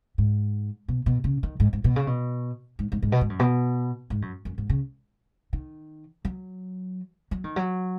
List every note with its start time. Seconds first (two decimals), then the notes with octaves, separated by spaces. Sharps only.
0.18 G#2
0.88 B2
1.06 B2
1.24 C#3
1.43 D#3
1.60 G#2
1.73 G#2
1.84 B2
1.96 C#3
2.07 B2
2.79 G#2
2.92 G#2
3.02 G#2
3.12 B2
3.21 G#2
3.30 F#2
3.39 B2
4.10 G#2
4.22 F#2
4.45 F#2
4.58 G#2
4.70 C#3
5.53 D#3
6.25 F#3
7.31 F#3
7.44 D#3
7.56 F#3